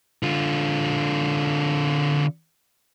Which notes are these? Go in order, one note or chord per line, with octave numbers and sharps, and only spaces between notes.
D3 F4